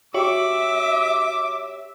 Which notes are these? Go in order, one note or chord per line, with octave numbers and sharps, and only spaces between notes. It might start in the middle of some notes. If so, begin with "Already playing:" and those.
F#4 G4 C#5 E5 D6